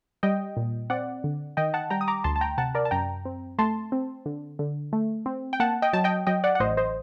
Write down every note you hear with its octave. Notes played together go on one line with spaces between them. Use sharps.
G3 D#5 G5
A#2
C4 D5 F#5
D3
D#3 D#5 G5
F#5 A5
G3 G5 A#5
D#6
A#5 D6
D2 A5 C6
A5
G5 A#5
C3 F#5 A5
A#4 D5
A5
F#2 G5 A#5
C4
A3 A5 C6
C4
D3
D3
A3
C4
G5
A#3 F#5 A5
D#5 G5
F#3 A5
D#5 G5
F#3 D#5 G5
D5 F#5
F#5
A1 C5 D#5
C5 D#5